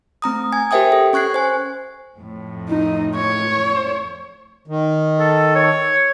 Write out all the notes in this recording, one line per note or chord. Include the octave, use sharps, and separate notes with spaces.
A3 C4 A#5 D#6
G#5 G#6
G4 A#4 C5 E5 G5 D#6
A4
C#4 C#6 F#6 G#6 C7
C5 G#5
F2 A2
D#4
C#5
D#3
A4
C#5